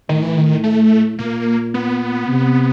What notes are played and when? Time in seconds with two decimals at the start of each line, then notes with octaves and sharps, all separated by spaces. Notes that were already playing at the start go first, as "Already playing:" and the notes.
0.09 A2 D#3
0.22 E3
0.37 D#3
0.64 A3
1.19 A#2 A#3
1.74 B3
2.28 C3